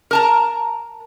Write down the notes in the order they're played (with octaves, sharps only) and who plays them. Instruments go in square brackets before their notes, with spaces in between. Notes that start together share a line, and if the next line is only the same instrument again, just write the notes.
[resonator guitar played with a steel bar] A#4 A5 A#5